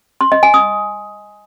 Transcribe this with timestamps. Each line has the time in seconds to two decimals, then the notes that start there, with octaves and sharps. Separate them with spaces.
0.21 C6
0.32 D#5
0.43 G#5
0.54 D#6